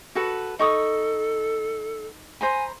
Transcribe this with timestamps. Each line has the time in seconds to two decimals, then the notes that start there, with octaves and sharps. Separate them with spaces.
0.15 F#4 A4 B4
0.59 D#4 A4 C#6 D#6
2.41 C5 G#5 A#5 B5